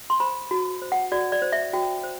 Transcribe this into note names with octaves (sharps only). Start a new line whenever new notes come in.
C6
C5 B5
F#4
C5
F#5
F#4 D5
D5
C5
E5
F#4 G5
C5